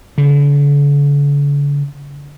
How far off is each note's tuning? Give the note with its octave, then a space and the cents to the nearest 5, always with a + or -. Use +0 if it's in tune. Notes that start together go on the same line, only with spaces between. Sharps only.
D3 -45